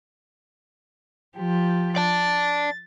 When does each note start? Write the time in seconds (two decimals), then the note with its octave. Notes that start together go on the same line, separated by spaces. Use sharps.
1.36 F3 G4
1.96 D5 A5 A6